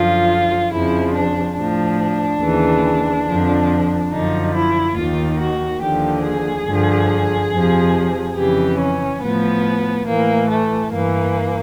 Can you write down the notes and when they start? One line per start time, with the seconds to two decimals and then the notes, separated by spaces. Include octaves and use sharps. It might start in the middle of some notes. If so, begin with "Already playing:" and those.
Already playing: F#2 D3 F3 F4
0.71 F2 C#3 F3 E4
1.14 D4
1.56 A2 F3 D4
2.42 D#2 C#3 E3
3.27 F2 D3 F3
4.12 F#2 D3 F3 D#4
4.54 E4
4.96 D#2 D#3 F4
5.39 F#4
5.82 D#2 D3 F3 G4
6.24 G#4
6.67 G2 D3 F3
7.51 F2 C3 F3
8.36 F2 C#3 E3 G4
8.79 C#4
9.22 A2 F3 B3
10.07 A2 E3 A#3
10.50 A3
10.92 G2 E3 A#3